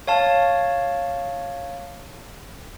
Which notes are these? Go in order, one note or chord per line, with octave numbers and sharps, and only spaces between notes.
C#5 F5 A5